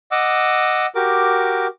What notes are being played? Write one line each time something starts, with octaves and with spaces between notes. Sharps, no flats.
D#5 F#5 D6 E6
F#4 G4 A#4 D6